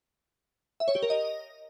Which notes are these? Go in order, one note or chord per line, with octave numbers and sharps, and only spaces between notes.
E5
C#5
G4
A#4
D#5